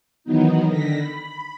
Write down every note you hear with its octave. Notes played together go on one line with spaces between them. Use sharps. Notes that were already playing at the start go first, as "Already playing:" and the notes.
D#3 E3 F#3 B3 D#4
D3 D#3 A#6 B6
B5